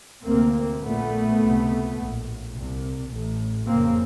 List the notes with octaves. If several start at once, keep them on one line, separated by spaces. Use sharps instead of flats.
D2 C3 A#3 C4
A#1 A#2 A3 B3
C#2 C3
A#1 A2
C2 C3
A1 A2
F#1 F2 C#3 A#3 C4